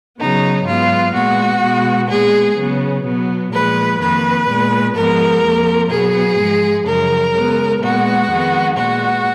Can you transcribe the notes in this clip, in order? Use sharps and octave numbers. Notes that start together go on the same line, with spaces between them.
C#3 F#3 B3 D#4
G#2 F#3 B3 F4
A#2 G#3 B3 F#4
B2 G#3 B3
A#2 G#3 B3 G#4
C#3 F#3 B3
B2 F#3 B3
A#2 F3 G#3 B4
F2 D#3 A#3 B4
A#2 G#3 B3
G#2 F3 G#3 B3 A#4
F2 F3 A#3
B2 F#3 B3 G#4
G#2 F3 G#3
F#2 C#3 F3 A#4
C#3 G#3 B3
A#2 G#3 B3 F#4
F2 D#3 G#3 B3
A#2 G#3 B3 F#4